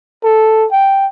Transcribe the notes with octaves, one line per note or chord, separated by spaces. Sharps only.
A4
G5